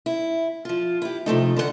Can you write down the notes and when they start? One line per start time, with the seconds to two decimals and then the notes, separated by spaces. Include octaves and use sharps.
0.06 E4
0.65 F3 F4
1.02 E4 G4
1.26 C3 F3 A3 D#4
1.56 D3 F4 A#4 F#5